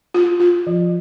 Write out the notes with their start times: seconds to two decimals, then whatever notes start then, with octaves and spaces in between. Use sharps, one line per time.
0.14 F4
0.40 F4
0.67 F3